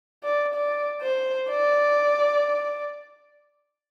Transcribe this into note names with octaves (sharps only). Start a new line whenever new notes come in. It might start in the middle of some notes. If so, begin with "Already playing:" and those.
D5
D5
C5
D5